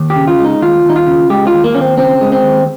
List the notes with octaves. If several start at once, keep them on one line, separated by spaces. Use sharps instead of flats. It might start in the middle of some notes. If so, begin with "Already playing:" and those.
Already playing: D#2
G4
C#3
F4
G#3
D#4
D#2 F4
D#2 D#4
F4
C#3
G#3 G4
F4
D#2
A#3
D#2 C#4
C4
C#3 C4
G#3
C4
D#2